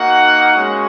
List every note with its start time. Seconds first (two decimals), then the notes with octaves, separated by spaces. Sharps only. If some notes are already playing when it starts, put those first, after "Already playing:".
Already playing: A#3 D#4 F#4 F#5
0.54 G#3 C#4 F#4